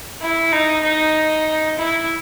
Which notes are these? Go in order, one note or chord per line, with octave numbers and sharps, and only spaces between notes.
E4
D#4
D#4
E4